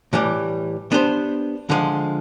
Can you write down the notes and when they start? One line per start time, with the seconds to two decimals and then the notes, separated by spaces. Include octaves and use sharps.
0.13 A2 E3 G3
0.92 B3 D4 G4 C5
1.70 D3 F3 G#3